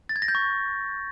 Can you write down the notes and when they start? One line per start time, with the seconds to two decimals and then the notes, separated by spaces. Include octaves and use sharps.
0.09 A6
0.16 G#6
0.22 A#6
0.28 G6
0.35 C#6